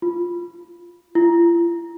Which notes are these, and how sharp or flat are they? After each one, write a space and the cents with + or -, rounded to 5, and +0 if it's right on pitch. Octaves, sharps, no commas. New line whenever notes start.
F4 +0
F4 -45